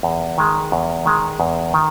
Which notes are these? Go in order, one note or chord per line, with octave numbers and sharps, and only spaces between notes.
E2
D#3 G#3
E2
D#3 G#3
E2
D#3